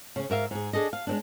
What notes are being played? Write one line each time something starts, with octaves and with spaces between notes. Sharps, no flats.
C#3 C#4
G#2 A#4 E5 F5
G#2 G#4
D4 G#4 A4 D#5
F5
G#3 C4 D4